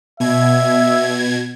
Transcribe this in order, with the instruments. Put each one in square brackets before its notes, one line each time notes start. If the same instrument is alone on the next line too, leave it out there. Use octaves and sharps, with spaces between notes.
[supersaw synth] B2 G#6 [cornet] E5